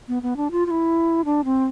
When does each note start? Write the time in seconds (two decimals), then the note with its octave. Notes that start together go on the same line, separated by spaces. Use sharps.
0.08 B3
0.23 B3
0.37 D4
0.51 F4
0.66 F4
0.71 E4
1.25 D4
1.45 C4